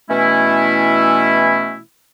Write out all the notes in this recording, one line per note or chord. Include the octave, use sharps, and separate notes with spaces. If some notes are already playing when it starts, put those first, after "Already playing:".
B2 E3 A3 C#4 E4